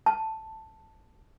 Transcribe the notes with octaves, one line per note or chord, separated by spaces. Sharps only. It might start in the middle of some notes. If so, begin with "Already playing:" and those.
A5